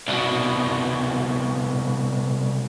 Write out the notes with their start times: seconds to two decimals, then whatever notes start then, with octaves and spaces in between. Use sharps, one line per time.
0.08 C2 B2